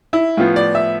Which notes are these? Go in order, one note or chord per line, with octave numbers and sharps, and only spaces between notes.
E4
A2 F3 B3 F4
D5
E5